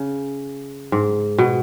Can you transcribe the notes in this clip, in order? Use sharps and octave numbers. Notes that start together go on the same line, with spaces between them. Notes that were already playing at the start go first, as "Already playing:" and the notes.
Already playing: C#3
G#2
B2